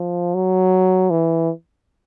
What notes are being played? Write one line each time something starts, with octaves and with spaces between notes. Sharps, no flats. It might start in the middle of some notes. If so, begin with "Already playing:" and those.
Already playing: F3
F#3
E3